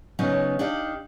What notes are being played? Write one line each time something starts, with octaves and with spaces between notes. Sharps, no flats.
C#3 F#3 B3 C#4 D#4
D4 D#4 G4 F5